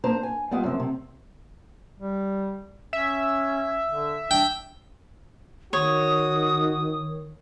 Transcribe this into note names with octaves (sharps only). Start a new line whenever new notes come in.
A#3 D4 C5 A#5
G#5
G3 G#3 B3 F4
F#2 C3 F3
C3
G3
C#4 E5
D3
D4 G5
D#3 F#4 C#5 D#6